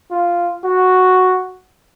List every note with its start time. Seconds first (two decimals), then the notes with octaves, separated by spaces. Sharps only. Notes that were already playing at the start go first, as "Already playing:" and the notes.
0.11 F4
0.64 F#4